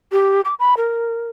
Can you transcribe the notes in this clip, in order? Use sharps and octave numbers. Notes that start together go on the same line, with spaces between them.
G4
D6
B5
A#4